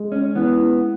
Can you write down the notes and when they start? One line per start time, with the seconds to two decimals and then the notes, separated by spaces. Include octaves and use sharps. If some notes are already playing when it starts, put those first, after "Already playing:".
Already playing: G#3
0.12 C#4
0.35 E3 B3